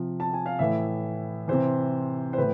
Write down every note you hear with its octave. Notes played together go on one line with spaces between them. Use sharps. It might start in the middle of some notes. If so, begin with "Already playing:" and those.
Already playing: C3 F3
A5
G#5
F5
A2 E3 E5
C3 E3 C5
C5
A2 E3 B4